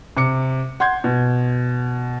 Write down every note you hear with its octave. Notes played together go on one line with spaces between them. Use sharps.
C3 D6 C#7
F#5 C6 G6 G#6
B2